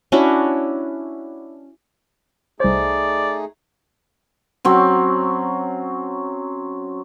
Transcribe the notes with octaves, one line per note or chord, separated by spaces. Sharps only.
C#4 D4 E4 F#4
C2 A3 D#4 G#4 C5 D5
F#3 C4 C#4